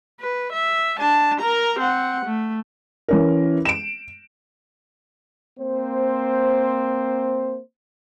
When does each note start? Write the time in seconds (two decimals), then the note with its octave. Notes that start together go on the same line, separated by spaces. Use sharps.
0.20 B4
0.52 E5
0.99 D4 A5
1.40 A#4 A#5
1.79 C4 F#5
2.25 A3
3.08 E3 C#4 A#4
3.65 D7 E7
5.57 A#3 C4 C5